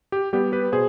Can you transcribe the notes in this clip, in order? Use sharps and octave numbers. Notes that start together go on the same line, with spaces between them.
G4
G3 B3 G4
G4 B4
B2 G#4 C5